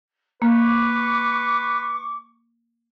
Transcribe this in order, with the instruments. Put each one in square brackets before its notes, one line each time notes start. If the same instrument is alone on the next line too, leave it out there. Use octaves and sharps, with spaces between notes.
[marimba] A#3 [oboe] B4 [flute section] C#6 D6